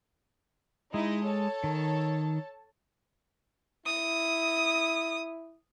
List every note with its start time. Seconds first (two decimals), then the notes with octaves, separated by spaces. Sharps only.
0.94 G#3 D#4 E4 D#5
1.26 A4 C#5 A5
1.64 D#3
3.86 E4 D#6